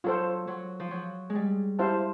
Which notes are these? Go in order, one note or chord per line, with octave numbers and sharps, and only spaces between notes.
F#3 F4 A4 C5
F#3
F3
F#3
G#3
G3
E4 G4 C5 F5 A5